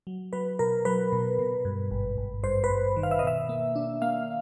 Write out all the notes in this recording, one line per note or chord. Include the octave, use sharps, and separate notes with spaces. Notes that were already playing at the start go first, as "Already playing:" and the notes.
F#3
F#3 B4
B2 A#4
F#3 B4
B2
B2
G2
G#1
G#1
G2 C5
B4
G2
D#3
F5
E5
D#5
B2 E5
A#3
D4
A#3 F5